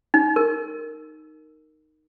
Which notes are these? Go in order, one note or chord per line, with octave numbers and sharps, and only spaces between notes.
D#4
A#4